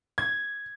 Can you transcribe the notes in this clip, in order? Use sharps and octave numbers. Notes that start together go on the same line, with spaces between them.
G#6